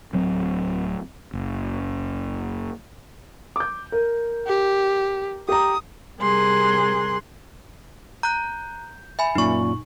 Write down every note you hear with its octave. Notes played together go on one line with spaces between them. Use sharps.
D1 F#3 C4
F#1
D6 G6
A#4
G4
G4 A#5 D#6
C3 G3 G#4 A#4 C6 F#6
A#5 F#6 G6
E5 G#5 B5
F#2 A#2 D#4 C#6